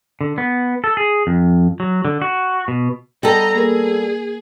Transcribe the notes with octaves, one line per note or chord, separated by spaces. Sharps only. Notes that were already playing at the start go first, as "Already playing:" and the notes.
D3
B3
A4
G#4
F2
F#3
D3
F#4
B2
G3 B3 A4 D#5 A#5
A#3 G#4 A#4